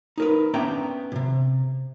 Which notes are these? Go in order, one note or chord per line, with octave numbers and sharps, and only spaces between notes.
D#4 A#4 B4
B3 C#4 D4 E5 G5 A#5
B1 C3